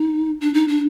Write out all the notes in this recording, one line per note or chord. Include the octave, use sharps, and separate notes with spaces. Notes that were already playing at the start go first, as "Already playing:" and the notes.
Already playing: D#4
D4
D#4
D4